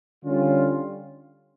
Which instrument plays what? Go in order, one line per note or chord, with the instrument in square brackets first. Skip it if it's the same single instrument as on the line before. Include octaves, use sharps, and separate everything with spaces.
[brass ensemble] D3 G3 C#4 F4